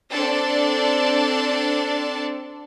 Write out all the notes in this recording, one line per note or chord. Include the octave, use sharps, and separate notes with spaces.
C4 D4 A4 D5 A5